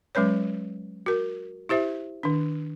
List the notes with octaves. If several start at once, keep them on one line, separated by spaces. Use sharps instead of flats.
F#3 G#3 C#4 B4 C#5
F#4 A#4
E4 G4 C5 E5
D#3 D4